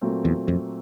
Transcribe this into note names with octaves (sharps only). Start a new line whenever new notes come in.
A#2 F#3 A3 C4
E2
F2